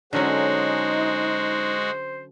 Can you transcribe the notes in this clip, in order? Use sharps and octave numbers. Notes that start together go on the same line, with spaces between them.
D3 F#3 G#3 C#4 D#4 F#4 C5